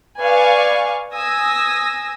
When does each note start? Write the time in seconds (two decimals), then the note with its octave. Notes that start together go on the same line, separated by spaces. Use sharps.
0.19 B4 D5 F5 G#5 C#6
1.13 G#5 D#6 E6 A#6